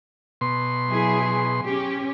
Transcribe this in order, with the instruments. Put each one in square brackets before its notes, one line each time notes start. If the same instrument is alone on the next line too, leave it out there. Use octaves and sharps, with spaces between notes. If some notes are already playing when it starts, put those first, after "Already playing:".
[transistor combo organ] B2 C6
[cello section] F#3 E4 G#4
C#4 G4